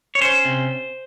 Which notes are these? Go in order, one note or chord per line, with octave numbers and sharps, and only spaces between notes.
C#5
C#4 C5
C3